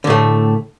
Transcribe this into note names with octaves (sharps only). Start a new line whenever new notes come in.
A2 D3 A3